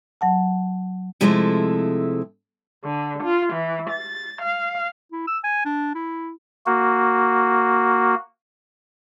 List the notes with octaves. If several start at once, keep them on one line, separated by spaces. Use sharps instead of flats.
F#3 F#5 A5
C3 F3 G#3 A3 E4 A4
D3
F4
E3
A6
F5
E4
E6
G#5
D4
E4
A#3 F#4